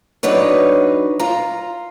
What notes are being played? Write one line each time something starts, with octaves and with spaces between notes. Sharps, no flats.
F#3 D4 D#4 B4 C#5
F4 A#5